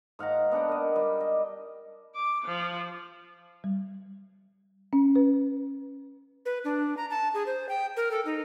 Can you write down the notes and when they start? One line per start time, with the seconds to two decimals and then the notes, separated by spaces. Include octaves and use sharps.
0.19 G#2 F5 F#5 A#5
0.52 B3 D4 F#5 G5
0.69 A#4 D#5
0.96 G3
1.21 D#5
2.15 D6
2.44 F3
3.64 G3
4.93 C#4
5.16 B4
6.46 B4
6.65 D4
6.97 A#5
7.10 A5
7.34 G#4
7.46 C5
7.69 G5
7.97 A#4
8.11 A4
8.25 D#4